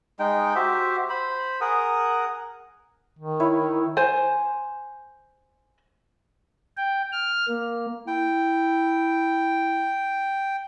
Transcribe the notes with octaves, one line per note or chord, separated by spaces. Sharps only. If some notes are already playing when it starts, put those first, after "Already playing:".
G#3 D#4 G5
F#4 G4 C5 E5
C5 B5
G#4 A#4 F#5 D#6
D#3
E4 B4 C#5
C5 G#5
G5
F6
A#3
E4 G5